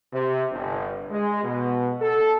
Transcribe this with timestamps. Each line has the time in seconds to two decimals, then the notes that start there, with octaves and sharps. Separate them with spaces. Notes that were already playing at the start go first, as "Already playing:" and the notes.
0.13 C3
0.51 G1
1.11 G#3
1.44 B2
2.01 A4